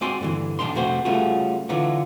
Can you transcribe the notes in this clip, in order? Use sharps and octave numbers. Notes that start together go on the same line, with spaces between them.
G#3 C4 F#4 D5 G#5 C6
G2 D3 E3
B1 B2 D4 D#4 C6
F2 C3 A3 F#4 C5
C#3 G3 A3 C#4 F4 F#4
D3 E3 F#3 F4 F#4